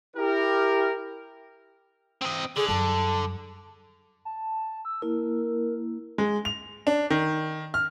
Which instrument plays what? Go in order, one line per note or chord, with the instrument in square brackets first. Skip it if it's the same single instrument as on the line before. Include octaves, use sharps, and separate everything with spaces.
[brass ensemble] E4 G4 A#4
[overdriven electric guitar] C4 D#5
[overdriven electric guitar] D3 [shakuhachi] G#4
[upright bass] F#2 G3 [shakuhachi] A5
[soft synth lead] A5
E6
[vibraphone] A#3 E4 [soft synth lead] A#4
[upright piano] G#3
F7
D4
D#3
F6